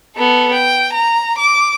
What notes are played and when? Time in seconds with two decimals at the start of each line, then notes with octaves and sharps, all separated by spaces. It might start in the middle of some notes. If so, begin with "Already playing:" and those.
0.16 B3 A4
0.53 G5
0.94 A#5
1.38 D6